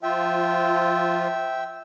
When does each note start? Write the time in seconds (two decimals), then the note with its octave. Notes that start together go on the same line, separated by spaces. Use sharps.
0.03 F3 F4 E5 G5